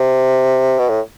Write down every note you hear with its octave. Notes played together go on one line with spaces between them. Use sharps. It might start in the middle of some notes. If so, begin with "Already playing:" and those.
Already playing: C3
B2
A2